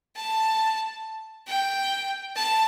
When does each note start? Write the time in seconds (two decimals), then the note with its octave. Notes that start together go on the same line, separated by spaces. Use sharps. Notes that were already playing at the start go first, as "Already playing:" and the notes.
0.16 A5
1.48 G5
2.36 A5